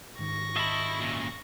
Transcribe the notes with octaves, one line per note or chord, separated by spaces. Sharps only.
G#2 D#3 C#6 A#6
F4 D#5 E5 A5 B5
A#2 C#3